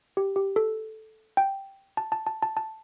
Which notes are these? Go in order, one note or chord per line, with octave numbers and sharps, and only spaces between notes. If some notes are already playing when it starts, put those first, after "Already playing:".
G4
G4
A4
G5
A5
A5
A5
A5
A5